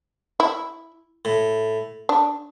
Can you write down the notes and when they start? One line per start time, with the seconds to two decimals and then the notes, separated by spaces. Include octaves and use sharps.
0.40 E4
1.25 A2
2.09 D4